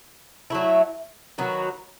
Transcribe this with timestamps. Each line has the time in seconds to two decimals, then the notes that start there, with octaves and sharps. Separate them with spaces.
0.50 F#3 A3 E4
1.38 D#3 F#3 B3 F#4